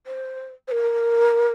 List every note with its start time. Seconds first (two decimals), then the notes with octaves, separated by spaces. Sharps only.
0.07 C5
0.68 C5
0.71 A#4